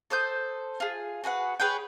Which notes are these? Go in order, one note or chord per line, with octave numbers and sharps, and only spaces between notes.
A4 C5 D#6 G6
F4 G#4
F#4 G#4 B4 F#5
G#4 B4 C#5 G5